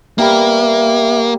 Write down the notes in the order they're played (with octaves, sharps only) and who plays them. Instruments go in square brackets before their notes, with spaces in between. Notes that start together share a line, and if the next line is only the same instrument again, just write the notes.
[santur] G3 B3 [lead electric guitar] A#3 [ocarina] E5